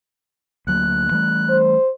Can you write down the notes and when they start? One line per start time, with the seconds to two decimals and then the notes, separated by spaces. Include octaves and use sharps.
0.67 D2 F#3 A#3 F#6
1.11 E3 G3 A3
1.49 C5